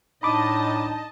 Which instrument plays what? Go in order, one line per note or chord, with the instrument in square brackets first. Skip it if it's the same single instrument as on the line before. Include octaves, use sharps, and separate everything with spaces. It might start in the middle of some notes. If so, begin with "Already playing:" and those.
[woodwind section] A2 D4 D#4 [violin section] D#5 A5 [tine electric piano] B5 D6